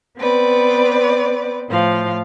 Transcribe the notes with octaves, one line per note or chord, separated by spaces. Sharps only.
B3 C4 B4 D5
A2 F3 F5